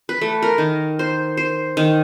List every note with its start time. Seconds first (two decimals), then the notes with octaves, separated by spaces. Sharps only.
0.09 B4
0.21 A3
0.42 A#4
0.58 D#3
0.99 C5
1.37 C5
1.77 D#3